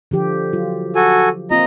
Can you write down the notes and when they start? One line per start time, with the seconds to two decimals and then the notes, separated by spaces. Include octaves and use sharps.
0.11 D3 F3 G4
0.53 F#3 F4
0.96 F#4 A4 G#5
1.51 A#3 C4 F4 D#5 A#5